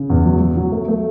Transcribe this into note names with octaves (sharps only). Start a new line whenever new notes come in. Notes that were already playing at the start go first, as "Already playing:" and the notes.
Already playing: C#3
E2
F#3
F#3
F#3
A3
A3